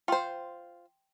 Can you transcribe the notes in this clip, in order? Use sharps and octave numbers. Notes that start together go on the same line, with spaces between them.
F4 C5 G5 C6